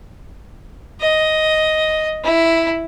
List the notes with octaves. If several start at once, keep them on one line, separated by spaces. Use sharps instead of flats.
D#5
E4